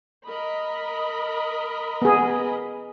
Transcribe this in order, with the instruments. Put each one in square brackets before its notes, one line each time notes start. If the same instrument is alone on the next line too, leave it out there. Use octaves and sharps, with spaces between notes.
[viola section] A#4 D#5 B5
[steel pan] B3 G#4